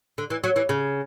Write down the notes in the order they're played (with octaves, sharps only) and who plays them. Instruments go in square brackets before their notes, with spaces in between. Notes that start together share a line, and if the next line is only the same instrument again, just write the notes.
[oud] D3
E3
F#3
E3
C#3